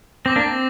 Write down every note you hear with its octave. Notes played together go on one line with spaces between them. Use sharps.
C4 D6 G6 A#6
A#3 D4
C4